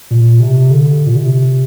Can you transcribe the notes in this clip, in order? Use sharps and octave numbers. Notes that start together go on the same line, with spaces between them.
A#2
C3
D3
A#2
C3